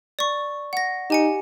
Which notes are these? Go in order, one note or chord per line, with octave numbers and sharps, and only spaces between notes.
D5 C#6
F#5 A#6
D#4 G4 G#5 C#7